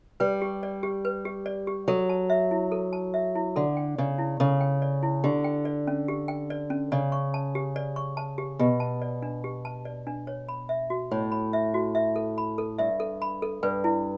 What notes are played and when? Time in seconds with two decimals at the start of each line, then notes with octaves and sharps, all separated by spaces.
0.20 G3 B4
0.42 G4
0.63 D5
0.83 G4
1.05 B4
1.25 G4
1.46 D5
1.67 G4
1.88 F#3 A4
2.09 A5
2.30 E5
2.51 E4
2.72 A4
2.93 A5
3.14 E5
3.35 E4
3.56 D3 A4
3.77 G5
3.98 C#3 D5
4.18 E4
4.40 C#3 A4
4.61 G5
4.82 D5
5.03 E4
5.24 D3 G4
5.44 G5
5.65 D5
5.87 C#4
6.08 G4
6.28 G5
6.50 D5
6.70 C#4
6.92 C#3 D5
7.12 C#6
7.34 A5
7.55 G4
7.76 D5
7.96 C#6
8.17 A5
8.38 G4
8.59 B2 G4
8.80 A5
9.02 D5
9.22 D4
9.44 G4
9.65 A5
9.85 D5
10.07 D4
10.27 C#5
10.49 B5
10.69 E5
10.90 F#4
11.11 A2 C#5
11.32 B5
11.53 E5
11.74 F#4
11.95 E5
12.16 A4
12.38 B5
12.58 A4
12.78 G2 E5
13.00 A4
13.22 B5
13.42 A4
13.63 G2 B4
13.84 E4